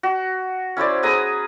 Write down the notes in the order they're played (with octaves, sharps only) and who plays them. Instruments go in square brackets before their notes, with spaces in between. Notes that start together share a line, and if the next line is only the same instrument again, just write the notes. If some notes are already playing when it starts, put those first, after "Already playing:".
[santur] F#4
C#4 E4 C5 D5
G#4 B4 A#5 D#6